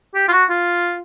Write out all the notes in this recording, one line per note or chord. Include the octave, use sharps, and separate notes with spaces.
G4
F4
F#4
F4